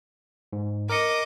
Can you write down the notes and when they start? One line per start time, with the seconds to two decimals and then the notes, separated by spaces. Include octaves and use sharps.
0.53 G#2
0.90 A#4 D#5 D6 C#7